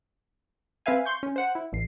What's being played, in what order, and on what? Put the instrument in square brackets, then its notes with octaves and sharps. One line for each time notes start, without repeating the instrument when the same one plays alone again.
[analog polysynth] C4 B4 E5 F5 G#5
C6 C#6 G6
C#4
C5 F#5
E4
A1 C7